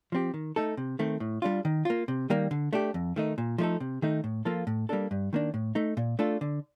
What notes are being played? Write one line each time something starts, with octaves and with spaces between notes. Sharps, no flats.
F3 C4 G4
D#3
A3 D#4 A4
C3
D#3 A3 C4
A2
G3 D4 F4
D#3
A#3 F4
C3
D#3 G3 A#3
D3
A3 D4 G4
F2
D#3 A3 D#4
A#2
F3 A3 D#4 A4
C3
D#3 A3 D#4
A2
F3 A#3 F4 A4
A2
G3 A#3 D4 A4
G2
D#3 A#3 D4
A2
A3 D#4
A#2
A3 D4 F4 A4
D3